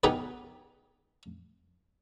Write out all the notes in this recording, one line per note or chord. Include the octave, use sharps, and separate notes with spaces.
B3 D#4 G4 G#4 A#4 B4